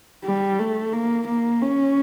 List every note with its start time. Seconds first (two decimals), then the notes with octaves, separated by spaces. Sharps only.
0.25 G3
0.59 A3
0.93 A#3
1.28 A#3
1.62 C#4